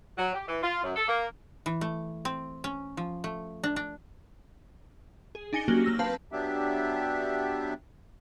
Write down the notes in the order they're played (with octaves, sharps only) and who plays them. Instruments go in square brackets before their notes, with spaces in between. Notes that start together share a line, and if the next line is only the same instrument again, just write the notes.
[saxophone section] F#3
G4
E3
F4
F#2
A4
A#3
[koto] E3
A3
C4
C#4
F3
A3
D4
D4
[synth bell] G#4
D4 D#4 G#5 A#6 C#7 G7
F#3 A#3 C#4 F#4 G4
A#3 E6 A#6
C4 B4 F5 A5
[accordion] F#3 B3 D4 G4 E5